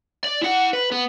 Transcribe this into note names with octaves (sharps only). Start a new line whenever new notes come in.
D5
E4 F#5
B4
B3